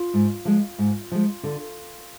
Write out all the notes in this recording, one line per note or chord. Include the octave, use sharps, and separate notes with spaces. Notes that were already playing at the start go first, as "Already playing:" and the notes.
Already playing: F4
G#2
F3 G#3
G#2
F3 G#3
D3